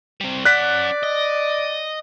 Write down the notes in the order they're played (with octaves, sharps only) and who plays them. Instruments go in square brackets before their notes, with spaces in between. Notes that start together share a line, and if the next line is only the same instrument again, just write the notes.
[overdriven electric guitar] G3 C4
[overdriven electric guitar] C#4 F#5 [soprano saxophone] D5 [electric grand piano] F#6 B6
[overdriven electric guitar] D#5